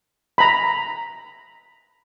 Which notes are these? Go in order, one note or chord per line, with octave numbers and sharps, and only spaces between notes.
A#5 B5